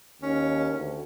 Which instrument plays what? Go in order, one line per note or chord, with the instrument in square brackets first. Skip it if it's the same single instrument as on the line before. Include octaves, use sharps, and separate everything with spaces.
[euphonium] D#2 [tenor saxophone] C#4
[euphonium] D2